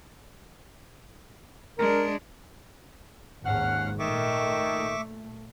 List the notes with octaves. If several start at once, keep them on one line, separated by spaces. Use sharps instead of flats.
G#3 D4 A#4
G#1 D#2 G#2 C#4 F5 F#5 F6
A#2 D#3 A3 E5 C#6 D6